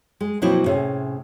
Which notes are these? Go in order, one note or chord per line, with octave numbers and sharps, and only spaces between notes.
G#3
B2 F3 F#3 A#3 C4 E4
A2 C3 C#4 G#4